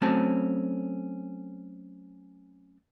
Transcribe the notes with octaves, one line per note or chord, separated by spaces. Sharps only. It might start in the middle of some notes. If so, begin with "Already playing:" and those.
F#3 A3 C4 C#4 A4 A5